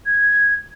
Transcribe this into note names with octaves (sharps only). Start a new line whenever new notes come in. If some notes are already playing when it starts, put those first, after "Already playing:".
G#6